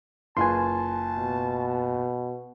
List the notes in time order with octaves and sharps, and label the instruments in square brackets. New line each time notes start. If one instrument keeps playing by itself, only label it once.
[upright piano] F#1 F4 B4 [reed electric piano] G#5 C6 [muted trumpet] A5
[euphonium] B2